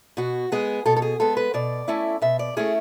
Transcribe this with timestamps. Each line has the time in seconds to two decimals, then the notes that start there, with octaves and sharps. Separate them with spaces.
0.17 B2 F#4
0.52 G#3 B3 G#4
0.86 B2 A4
0.96 A4
1.02 G#4
1.20 G#3 B3 A4
1.37 B4
1.54 B2 D5
1.88 A3 C#4 E4
2.22 B2 E5
2.39 D5
2.57 A3 C#4 E4 G#4